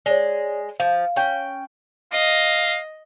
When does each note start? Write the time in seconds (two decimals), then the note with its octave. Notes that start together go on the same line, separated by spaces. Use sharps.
0.06 G#3 C#5 D5
0.80 F3 F5
1.16 C#4 G5
2.13 D#5 F5